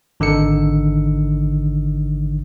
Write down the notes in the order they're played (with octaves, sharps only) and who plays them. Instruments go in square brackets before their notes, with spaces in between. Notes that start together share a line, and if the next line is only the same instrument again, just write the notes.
[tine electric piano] G#1 D3 D#3 D#4 E6 C#7